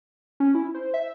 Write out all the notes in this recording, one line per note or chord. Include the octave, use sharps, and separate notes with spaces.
C#4
E4
C5
E5